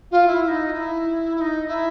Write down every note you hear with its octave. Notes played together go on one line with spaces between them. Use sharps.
F4
E4
E4
D#4
E4
E4
D#4
E4